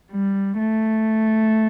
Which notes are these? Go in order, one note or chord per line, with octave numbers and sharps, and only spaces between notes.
G3
A3